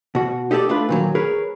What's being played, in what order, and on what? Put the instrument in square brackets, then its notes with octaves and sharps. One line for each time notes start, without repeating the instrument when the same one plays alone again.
[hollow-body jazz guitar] B2 F#4
D#4 G4 A4 C#5 D5
A3 D4 F4 B4
A#2 D#3 F#3
G#4 A#4 B4 C#5